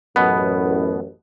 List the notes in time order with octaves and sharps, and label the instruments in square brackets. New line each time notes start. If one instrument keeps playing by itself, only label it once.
[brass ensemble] A1 F#2 [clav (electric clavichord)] B2 B3